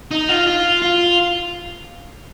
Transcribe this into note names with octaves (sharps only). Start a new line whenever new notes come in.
D#4
F4
F4
F4